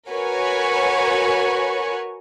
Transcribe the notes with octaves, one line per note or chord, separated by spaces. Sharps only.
F#4 A#4 B4 C#5 G#5 C#6